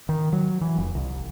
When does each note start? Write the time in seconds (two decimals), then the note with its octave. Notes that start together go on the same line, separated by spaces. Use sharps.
0.09 D#3
0.33 F#3
0.61 E3
0.78 F1
0.95 C2